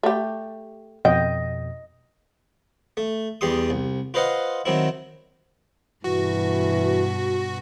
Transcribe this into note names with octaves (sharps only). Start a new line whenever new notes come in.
A3 G4
F2 B2 D#5 G5
A3
E2 G3 G4 C6 D#6
C2
F4 B4 C5 D#5 F5 F#5
D#3 F#3 C4 E4
G2 B2 E3 F#4